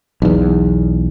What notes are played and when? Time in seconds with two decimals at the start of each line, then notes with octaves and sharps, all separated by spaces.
0.22 B1 E2